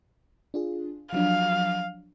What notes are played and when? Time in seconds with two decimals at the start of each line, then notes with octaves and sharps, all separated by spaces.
0.54 D4 F4 G#4
1.13 F3 F#3 D4 F5